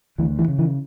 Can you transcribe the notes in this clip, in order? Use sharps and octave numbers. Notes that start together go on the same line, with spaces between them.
D2 E3
E3
C#3
E3